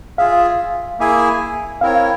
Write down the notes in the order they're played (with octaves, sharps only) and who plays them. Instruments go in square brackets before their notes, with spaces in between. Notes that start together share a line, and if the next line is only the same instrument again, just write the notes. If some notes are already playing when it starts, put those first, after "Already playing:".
[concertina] F4 G#4 E5 [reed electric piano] F5
[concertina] A#3 E4 G#4 E5 G#5
[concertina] C4 E4 A#4 C#5 [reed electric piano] F5